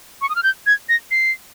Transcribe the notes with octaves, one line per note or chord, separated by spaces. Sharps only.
C#6
D#6
F6
G6
G#6
A#6
C7